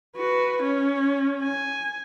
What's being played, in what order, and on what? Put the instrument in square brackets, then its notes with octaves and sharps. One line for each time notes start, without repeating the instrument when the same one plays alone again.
[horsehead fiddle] F#4 B4
C#4
G#5